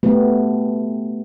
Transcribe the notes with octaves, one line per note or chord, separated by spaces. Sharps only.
A3 B3 G4